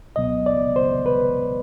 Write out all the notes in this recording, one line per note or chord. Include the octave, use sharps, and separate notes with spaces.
C#2 B2 F#3 B3 D#5
D5
C5
B4